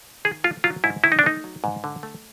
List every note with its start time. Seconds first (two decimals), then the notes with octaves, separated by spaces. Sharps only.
0.25 D#3 G#4
0.44 A3 F4
0.64 F#3 F4
0.84 G#2 E4
1.04 D#3 E4
1.12 D#4
1.19 D4
1.24 A3 D#4
1.44 F#3
1.64 G#2
1.84 D3
2.03 A3